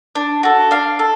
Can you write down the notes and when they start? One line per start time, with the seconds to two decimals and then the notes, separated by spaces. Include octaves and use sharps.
0.15 D4
0.43 F#4 A4
0.71 D4 F5
0.99 A4